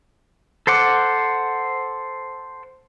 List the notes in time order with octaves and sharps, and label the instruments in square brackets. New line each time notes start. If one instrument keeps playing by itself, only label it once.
[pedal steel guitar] A4 C5 F#5 D6